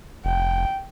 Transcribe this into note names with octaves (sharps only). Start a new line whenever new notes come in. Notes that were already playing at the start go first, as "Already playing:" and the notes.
F1 G5